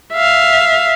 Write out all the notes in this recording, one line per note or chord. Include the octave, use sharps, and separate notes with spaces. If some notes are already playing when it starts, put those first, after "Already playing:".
E5 F5